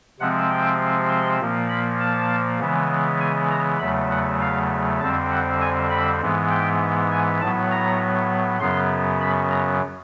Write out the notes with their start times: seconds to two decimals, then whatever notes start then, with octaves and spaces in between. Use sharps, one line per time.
0.20 C3 F3 G#3 C4 F#5
0.50 G5
1.10 C6
1.40 A#2 F3 A#3
1.69 B5
2.00 A5
2.59 C#3 E3 G#3 B3
3.20 G#5
3.51 A#5
3.80 E2 C#3 F#3 A3 B5
4.10 F#5
4.41 F5
5.00 F2 D3 G3 C4 A5
5.31 F#5
5.61 G#5
5.90 B5
6.21 G#2 E3 G#3 B3
6.50 G5
7.11 G#5
7.41 A2 F#3 B3 A5
7.71 A#5
8.60 F#2 C#3 F#3 B3 C6
9.21 B5
9.51 A#5